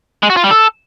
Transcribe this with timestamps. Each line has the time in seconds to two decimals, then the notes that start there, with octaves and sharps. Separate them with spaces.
0.23 G#3
0.30 F#4
0.37 F4
0.44 G3
0.51 A4